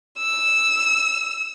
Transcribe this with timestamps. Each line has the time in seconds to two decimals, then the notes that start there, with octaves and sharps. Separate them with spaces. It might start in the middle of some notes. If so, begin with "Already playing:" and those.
0.19 E6